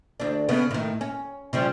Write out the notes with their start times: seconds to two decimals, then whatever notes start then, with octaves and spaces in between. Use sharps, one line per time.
0.20 D2 D4
0.49 C#3 B3
0.71 A2 D#3
1.01 C#4
1.53 C#3 F3 G3